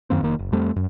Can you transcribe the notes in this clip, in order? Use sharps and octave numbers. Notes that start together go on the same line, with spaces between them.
F#2 D#3 A#3 C4
F1 D#3 A#3
F#1
F2 G3 A3 C4
F#2